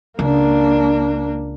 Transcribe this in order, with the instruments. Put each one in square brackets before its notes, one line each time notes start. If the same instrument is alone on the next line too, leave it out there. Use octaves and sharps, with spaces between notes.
[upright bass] C#2 [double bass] A#3 D4